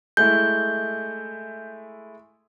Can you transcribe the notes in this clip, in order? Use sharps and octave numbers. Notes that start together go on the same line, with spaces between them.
G#3 A3 E4 G6